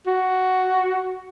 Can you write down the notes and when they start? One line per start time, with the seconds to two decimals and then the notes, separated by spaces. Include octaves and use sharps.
0.07 F#4